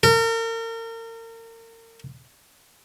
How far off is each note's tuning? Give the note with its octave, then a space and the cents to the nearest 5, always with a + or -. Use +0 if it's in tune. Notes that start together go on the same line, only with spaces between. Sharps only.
A#4 -35